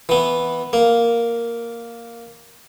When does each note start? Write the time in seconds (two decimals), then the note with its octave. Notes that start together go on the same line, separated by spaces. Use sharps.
0.09 E3 B3
0.73 A#3